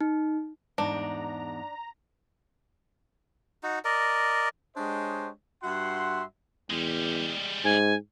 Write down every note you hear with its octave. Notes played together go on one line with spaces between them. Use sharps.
D#4
E2 G#2 D4 A#5
D#4 F#4
A#4 D5 D#5
G#3 D4 G4 C5 C#5 D#5
G2 F#4 E5 F#5 C6
E2 G3 G#3
G#2 G#5